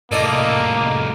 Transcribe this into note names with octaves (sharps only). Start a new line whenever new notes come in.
C2 A2 A#3 A4 D5 D#5